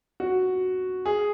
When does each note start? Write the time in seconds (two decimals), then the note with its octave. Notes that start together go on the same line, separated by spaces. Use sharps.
0.20 F#4
1.06 G#4